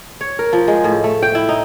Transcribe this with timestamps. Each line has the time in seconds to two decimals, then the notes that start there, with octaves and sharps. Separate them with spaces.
0.21 C#5
0.39 A#4
0.53 F3
0.68 G#3
0.84 A2
1.04 A3
1.23 G5
1.35 E4
1.49 D#4